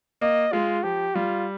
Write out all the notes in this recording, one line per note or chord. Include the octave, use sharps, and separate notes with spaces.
A#3 D#5
G#3 F4
F3 G4
G3 F4